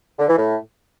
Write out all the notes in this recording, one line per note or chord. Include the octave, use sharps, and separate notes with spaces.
D3
E3
A2